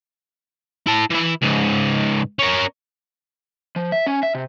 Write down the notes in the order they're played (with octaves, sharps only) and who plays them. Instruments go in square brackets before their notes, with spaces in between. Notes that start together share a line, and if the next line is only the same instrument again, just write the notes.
[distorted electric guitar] E4 A5
E3 E4
C#2 G#2
C#4 A#4
[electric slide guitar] F3
E5
C#4
E5
C3